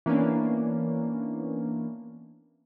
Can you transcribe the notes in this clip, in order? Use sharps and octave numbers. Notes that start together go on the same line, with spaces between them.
E3 A#3 B3 C#4 D4